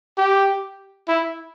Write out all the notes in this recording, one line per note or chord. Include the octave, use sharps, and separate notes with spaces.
G4
E4